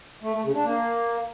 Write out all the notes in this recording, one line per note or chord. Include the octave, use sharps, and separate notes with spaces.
A3
A3
C#3
D4
A#3